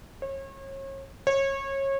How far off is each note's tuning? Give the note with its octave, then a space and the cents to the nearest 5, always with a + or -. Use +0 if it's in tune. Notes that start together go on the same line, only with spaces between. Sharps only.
C#5 -35
C#5 -25